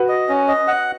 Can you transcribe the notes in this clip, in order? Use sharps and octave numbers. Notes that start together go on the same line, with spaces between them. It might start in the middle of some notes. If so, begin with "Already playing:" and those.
Already playing: F#4 B4
D#5
C#4
D#5
F#5